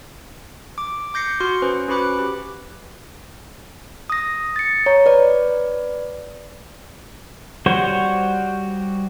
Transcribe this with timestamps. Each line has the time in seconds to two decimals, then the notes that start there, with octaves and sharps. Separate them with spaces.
0.78 D6
1.14 D6 G6 A#6 C7 C#7
1.40 F#4 C6 F6 C#7
1.62 C#4 B4 C5
1.88 C#4 F#4 B4 B5 D6 F#6
2.19 G4
4.10 D#6 A#6
4.56 A6 C#7
4.86 C#5 A#5
5.06 B4 D5
7.66 G3 F#4 C5 C#5